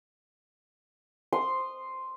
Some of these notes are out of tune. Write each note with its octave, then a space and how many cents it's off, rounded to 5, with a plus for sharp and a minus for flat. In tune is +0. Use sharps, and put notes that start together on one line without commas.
C6 +0 D#6 -15